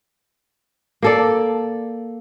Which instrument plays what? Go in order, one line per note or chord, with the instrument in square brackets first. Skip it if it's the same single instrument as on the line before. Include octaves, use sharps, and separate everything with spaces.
[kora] A#3 A4 D5